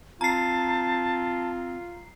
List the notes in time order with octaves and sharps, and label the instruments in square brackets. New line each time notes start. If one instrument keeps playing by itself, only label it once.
[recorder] C4 [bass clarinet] F4 [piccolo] A5 [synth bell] A#5 C7